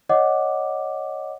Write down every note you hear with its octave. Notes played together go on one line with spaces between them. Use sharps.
C#5 D#5 F#5 D6